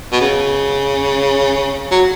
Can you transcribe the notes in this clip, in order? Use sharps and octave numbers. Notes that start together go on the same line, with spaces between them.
B2
C#3
F#3